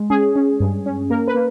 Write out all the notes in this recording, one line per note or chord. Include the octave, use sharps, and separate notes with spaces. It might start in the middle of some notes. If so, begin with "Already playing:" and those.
Already playing: G#3
C#4 G#4
C#4
G2
C#4
A#3 A#4
B4
A#3